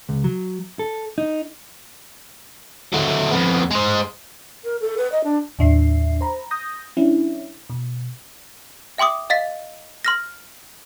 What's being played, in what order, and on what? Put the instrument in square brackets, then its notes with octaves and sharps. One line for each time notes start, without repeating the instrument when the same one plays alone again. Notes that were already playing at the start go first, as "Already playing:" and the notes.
[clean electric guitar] C#2
F#3
A4
D#4
[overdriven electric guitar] F#3 A3
F2 B3
G#3 C5
[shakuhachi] A#4
A4
B4
D#5
D4
[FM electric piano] D#2 A2 D4 E5 C7
C5 A#5 B5
D#6 G6 A#6
F#3 C#4 D4 E4
B2
[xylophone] E5 G5 C6 D6 D#6
D#5 F5 A6 B6
C6 F6 A#6